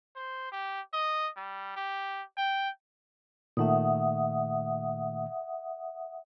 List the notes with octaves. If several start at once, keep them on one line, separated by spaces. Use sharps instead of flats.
C5
G4
D#5
G3
G4
G5
A#2 D#3 A3 E5 F#5 D#6